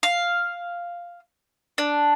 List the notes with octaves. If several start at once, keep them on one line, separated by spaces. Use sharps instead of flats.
F5
D4